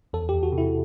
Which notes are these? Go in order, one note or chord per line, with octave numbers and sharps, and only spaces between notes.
E2 A4
E2 G4
F#4
C3
E4